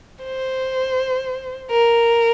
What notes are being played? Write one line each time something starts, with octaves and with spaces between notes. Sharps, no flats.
C5
A#4